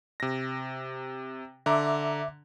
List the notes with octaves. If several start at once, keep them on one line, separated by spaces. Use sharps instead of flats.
C3 A#6
D3 E5 A#5 D6